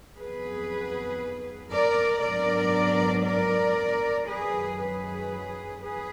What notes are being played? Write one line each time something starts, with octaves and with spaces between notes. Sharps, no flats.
F2 D#3 F#3 B3 G#4 B4
A#4 D5
G#2 F#3 B3 D4 A#4 D5
A#4 D5
F#2 D#3 F#3 G#4 B4
G#4 B4
G#4 B4